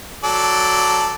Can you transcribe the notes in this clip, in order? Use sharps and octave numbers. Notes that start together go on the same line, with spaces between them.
F#3 A4 D5